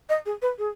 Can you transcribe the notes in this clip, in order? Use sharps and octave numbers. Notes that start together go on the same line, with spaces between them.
D#5
G#4
B4
G#4